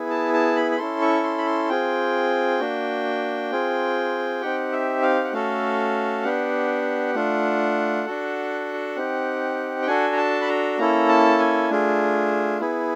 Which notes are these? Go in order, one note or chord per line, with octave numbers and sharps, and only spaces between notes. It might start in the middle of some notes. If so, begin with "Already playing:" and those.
Already playing: B3 E4 G#4
A5
A5
B5
B5
C#4 E4 A4 C6
C#6
C6
B5
C6
C4 F4 G#4 G5
A#3 D4 F#4
C4 F4 G#4
C4 D#4 G4 F#5
E5
F5
F#5
A3 C#4 F#4 A4 F5
B3 D4 G4 F#5
A3 D4 F4
D4 F#4 A4
C4 D#4 G4
G5
D4 F#4 A4 G#5
A#5
A5
B5
A#5
A#3 C#4 E4 A4 A#5
A5
G#5
A3 D4 F4 G#4
B3 E4 G#4